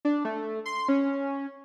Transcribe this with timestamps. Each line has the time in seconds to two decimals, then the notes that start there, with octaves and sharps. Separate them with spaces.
0.05 D4
0.25 A3
0.66 C6
0.89 C#4